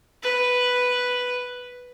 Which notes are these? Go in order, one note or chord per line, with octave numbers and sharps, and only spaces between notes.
B4